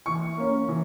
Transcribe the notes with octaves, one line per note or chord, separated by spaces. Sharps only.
E3 C#6
A#3 C#4
E3